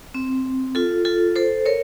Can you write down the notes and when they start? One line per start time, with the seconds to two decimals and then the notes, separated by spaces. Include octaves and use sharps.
0.14 C4
0.75 F4 A4
1.05 F4 A4
1.36 A4 C5
1.65 A#4 C#5